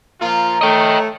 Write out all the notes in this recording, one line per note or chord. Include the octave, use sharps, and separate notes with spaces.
A#2 F3 F4 A#5
A3 C#5 D#5 G5